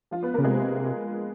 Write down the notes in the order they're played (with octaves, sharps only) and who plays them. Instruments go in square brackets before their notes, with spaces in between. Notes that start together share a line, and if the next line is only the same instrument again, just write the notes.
[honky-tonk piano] F3 F4
B3 B4
A#3 A#4
[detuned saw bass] C#3
[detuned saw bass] C3 [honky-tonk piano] G#3 G#4